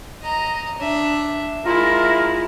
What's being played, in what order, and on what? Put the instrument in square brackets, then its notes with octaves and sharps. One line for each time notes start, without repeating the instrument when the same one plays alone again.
[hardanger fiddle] D#5 A#5
D4 E5
[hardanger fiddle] G#3 E4 [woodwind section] F4 A#4